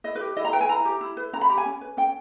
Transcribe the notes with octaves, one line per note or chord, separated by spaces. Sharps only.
E4 D#5
B4
G4
E4 D#5
A#5
B4 G5
G#5
E4 A#5
G4
E4
B4
C#4 A#5
B5
G4 A#5
G#5
C#4
B4
C#4 G5